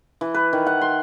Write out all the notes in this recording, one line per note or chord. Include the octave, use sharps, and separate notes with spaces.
E3
B4
D#3
F#5
C6